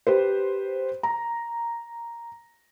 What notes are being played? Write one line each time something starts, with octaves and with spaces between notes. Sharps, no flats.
G4 B4 C5
A#5